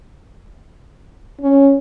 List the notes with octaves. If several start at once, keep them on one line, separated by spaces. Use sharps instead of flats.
C#4